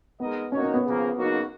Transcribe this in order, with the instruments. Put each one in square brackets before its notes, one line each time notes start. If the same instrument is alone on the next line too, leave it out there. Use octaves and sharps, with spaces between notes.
[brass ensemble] G#3 D#4 A#4 D#5 [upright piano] B3
[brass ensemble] A#3 D#4 F#4 C#5 [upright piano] C#4
[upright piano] C#4
B3
[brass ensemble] C#3 F3 A#3
C#3 F#3 A#3 D#4 F#4